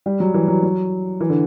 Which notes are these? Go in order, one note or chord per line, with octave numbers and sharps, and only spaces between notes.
G3
F#3
E3
F#3
F#3
E3
D3